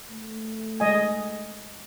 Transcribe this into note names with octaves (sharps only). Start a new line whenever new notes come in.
A3
G#3 D#5 G#5